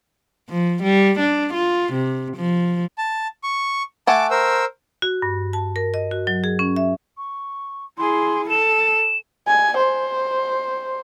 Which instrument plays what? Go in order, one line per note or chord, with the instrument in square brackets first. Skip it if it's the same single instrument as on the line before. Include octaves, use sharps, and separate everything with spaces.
[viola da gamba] F3
G3
D4
F4
C3
F3
[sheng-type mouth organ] A5
C#6
[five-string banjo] A3 F#5 G#5 [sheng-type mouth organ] A5 D6
[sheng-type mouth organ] A#4 C5 E6
[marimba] F#4
G2
A5
A#4
D#5
F#4
F#3
G#4
C#4
E5
[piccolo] C#6
[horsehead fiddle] E4 G#4 [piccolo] C6
[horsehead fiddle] A4 [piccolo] E7
[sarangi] G#5
C5